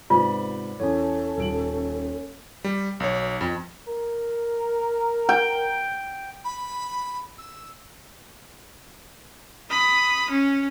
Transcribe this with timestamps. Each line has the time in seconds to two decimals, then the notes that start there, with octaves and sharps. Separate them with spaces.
0.10 G#2 C3 B3 F4 D5 B5
0.80 E2 C#4 A4 C#5
1.38 D#1 D7 F#7
2.64 G3
3.00 B1 C#5
3.41 F2
3.88 A#4
5.29 G5
6.44 B5
7.38 E6
9.71 B5 D#6
10.30 C#4